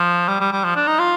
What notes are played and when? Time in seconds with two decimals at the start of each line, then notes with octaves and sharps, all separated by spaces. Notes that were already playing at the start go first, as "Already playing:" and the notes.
Already playing: F3
0.29 G3
0.40 G3
0.52 G3
0.64 F3
0.76 D4
0.87 D#4
0.99 F4